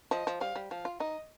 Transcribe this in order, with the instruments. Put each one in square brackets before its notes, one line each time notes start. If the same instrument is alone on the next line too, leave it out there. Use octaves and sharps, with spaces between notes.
[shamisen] F3 [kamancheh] D#5
[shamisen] F3
[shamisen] G3 [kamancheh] F5
[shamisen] G3
[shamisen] F3 [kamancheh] F5
[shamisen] F4
[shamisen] D#4 [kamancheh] D#5